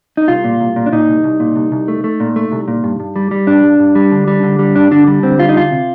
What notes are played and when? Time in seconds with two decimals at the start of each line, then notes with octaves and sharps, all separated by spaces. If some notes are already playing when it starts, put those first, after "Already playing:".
0.17 D#4
0.28 C2 F4
0.44 A#2
0.61 C2
0.76 A#2
0.86 D4
0.92 A#2 D#4
1.08 C2
1.24 C2
1.40 A#2
1.56 C2
1.72 C2
1.88 A3
2.04 A3
2.20 A#2
2.36 A3
2.52 C2
2.68 A#2
2.84 G2
3.00 G2
3.16 G3
3.31 G3
3.47 G2 D4
3.64 G2
3.80 G2
3.95 G3
4.11 D3
4.27 G3
4.43 D3
4.59 G3
4.75 G2 D4
4.91 D3 D4
5.07 G3
5.23 D3 C4
5.39 G3 F4
5.49 D#4
5.55 D2 F4
5.71 C3